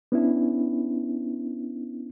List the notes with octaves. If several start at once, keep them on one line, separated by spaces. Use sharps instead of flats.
B3 C#4 D4 E4